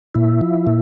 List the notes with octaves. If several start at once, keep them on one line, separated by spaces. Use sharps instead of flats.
A#2 E4
F3
A#2